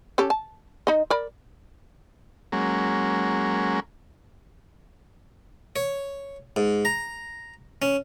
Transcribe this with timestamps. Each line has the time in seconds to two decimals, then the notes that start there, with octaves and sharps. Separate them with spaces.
0.18 C#4 G4 A4
0.30 A5
0.87 D#4 D#5
1.10 A#4 D5 B5
2.52 F#3 G#3 A#3 C#4
5.76 C#5
6.56 G#2
6.85 A#5
7.82 C#4